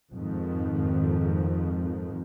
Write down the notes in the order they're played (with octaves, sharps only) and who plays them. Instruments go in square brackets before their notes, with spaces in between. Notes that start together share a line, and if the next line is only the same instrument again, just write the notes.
[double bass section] F2 G#2 D#3 F3